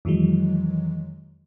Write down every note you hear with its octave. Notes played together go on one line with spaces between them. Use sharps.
F2 D#3 E3 F#3 G#3